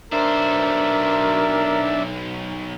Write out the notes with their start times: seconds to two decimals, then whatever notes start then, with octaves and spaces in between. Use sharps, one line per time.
0.12 B1 D4 A#4 C5 E5